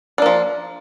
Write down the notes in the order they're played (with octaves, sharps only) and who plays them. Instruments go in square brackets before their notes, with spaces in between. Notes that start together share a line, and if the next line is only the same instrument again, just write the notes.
[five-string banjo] D4
A#3
F3